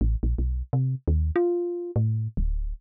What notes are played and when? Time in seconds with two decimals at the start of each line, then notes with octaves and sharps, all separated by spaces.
0.01 A1
0.23 A#1
0.38 B1
0.73 C3
1.08 D#2
1.36 F4
1.96 A2
2.37 D1